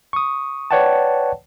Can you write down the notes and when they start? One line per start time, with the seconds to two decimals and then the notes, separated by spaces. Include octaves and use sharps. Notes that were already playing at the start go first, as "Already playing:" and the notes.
0.13 C#6 D#6
0.71 B4 C#5 D5 F#5 G5 A5